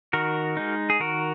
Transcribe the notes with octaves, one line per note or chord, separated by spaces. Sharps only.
D#3 F#4 A#4
G#3 D#4
G#4
D#3 F#4 A#4